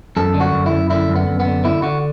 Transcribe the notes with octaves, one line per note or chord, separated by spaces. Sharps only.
F#2 A4
D3
F#4
F#2
E4
F#2
D3 E4
F#2
B3
F#2
B3
D3
D3 E4
D3 F#4